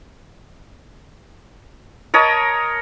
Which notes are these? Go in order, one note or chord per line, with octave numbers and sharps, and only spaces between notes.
A#4 C#5 D#5 A5